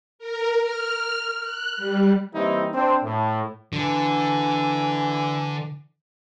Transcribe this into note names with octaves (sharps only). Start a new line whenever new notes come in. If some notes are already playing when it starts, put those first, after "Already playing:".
A#4
F6
F#6
G3
E3 G3 A#3 C4 D#4 E4
C4 D4 C5
A2
D3 E3